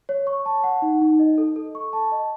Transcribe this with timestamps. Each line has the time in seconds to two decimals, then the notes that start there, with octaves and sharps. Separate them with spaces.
0.09 C#5
0.27 C#6
0.46 A5
0.64 F#5
0.82 D#4
1.01 D#4
1.19 D#5
1.38 A4
1.56 A4
1.75 C#6
1.93 A5
2.12 D#5